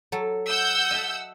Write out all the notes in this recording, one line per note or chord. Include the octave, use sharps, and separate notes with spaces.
F#3 A4
F#5 E6 G6
D#5 E5 A5